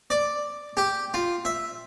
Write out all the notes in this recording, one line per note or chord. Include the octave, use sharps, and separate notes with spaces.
D5
G4
F4
E5